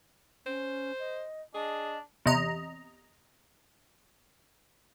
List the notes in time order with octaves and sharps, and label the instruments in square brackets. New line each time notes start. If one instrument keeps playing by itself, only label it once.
[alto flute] C#4 [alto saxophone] C5
[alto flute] D#5
[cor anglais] D4 [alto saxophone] G#4 [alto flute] D#5
[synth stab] E2 C3 D#5 A#5